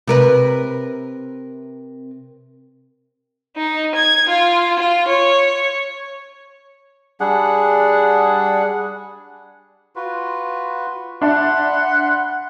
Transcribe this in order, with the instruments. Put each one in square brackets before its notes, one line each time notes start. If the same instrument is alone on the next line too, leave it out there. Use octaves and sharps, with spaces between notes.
[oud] C3 A#4 B4
[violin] D#4
G#6
F4
F4
C#5
[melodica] G3 D4 G#4 F#5
F4 F#4 B4
[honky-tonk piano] D4 E5 A5 [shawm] F#5 [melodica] B5 C6